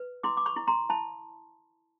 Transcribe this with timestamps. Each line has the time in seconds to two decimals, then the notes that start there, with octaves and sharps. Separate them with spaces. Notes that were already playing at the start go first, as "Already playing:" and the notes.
Already playing: B4
0.23 E4 C6 D6
0.37 D6
0.46 B5 C#6
0.56 E4
0.67 A#5 C6
0.90 E4 A5 B5